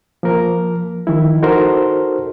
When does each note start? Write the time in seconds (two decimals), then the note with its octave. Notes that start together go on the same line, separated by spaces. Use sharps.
0.23 F3 A#3 A#4
1.07 D#3 F3 E4
1.42 D#4 F#4 A4 A#4 C5 C6